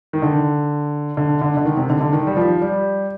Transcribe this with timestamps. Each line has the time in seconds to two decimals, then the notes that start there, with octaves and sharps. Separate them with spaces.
0.13 D#3
0.22 D3
1.17 D3
1.42 D3
1.57 D3
1.65 D#3
1.77 C3
1.90 D3
2.01 D3
2.13 D#3
2.27 G3
2.37 F3
2.62 G3